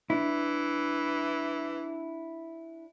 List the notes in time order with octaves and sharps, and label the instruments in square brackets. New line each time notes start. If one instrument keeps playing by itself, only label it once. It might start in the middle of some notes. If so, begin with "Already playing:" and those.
[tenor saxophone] E3 [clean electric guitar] D4 E4